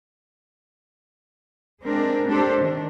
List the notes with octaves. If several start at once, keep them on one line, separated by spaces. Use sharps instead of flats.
G#3 C4 D4 A#4
D4 G4 A4 C5
D#3 D4